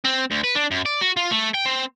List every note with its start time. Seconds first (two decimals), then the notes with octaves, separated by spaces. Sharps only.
0.05 C4
0.31 D2
0.44 B4
0.56 D4
0.71 F#2
0.86 D5
1.01 F#4
1.17 F4
1.31 A3
1.54 G5
1.66 C4